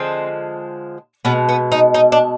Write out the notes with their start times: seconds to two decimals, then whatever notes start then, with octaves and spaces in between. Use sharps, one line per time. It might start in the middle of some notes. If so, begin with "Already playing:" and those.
Already playing: D3 F3 G#3 C4
1.25 B2 G#3 B3
1.49 B3
1.72 D#4
1.94 D#4
2.12 D4